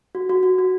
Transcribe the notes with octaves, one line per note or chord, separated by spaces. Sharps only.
F#4
F#4
F#4
F#4